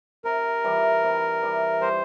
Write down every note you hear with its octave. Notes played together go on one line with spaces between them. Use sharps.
C3 A#4
E3 G3
C3
E3 G3
G3 C5